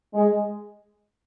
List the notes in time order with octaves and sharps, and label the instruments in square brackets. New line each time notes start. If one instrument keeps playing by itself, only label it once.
[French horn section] G#3